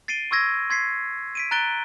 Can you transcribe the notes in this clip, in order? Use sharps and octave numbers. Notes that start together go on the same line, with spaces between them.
A6 C7 D7 D#7 G7
C6 C#6 E6 G#6 A#6
C6 G#6 B6 C7
B6 D7 D#7
A#5 F#6 A6 D7 G7